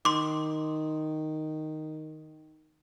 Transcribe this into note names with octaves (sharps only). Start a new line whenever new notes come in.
D#3 C6 D6